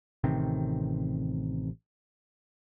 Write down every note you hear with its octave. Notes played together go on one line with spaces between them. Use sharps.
A1 C3 D#3 C4